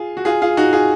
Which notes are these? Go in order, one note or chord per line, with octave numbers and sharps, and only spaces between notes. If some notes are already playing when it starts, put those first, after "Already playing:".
Already playing: F4 G#4
F#4
F4 G#4
F4 G#4
D#4 F#4
F4 G#4